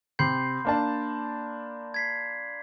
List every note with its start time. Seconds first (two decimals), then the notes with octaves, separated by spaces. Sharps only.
0.19 C3 B5 C6 G6 C7
0.65 A#3 D4 A5
1.94 G#6 B6 C7